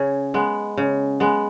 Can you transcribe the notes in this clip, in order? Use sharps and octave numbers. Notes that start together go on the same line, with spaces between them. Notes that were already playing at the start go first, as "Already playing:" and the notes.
Already playing: C#3 C#5
G#3 B3
C#3
G#3 B3